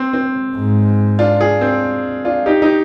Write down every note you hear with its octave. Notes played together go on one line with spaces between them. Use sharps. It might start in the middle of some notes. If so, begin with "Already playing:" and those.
Already playing: C4
C4
G#2
D4 F4
F4 G#4
C4
D4 F4
D#4 G4
D#4 G4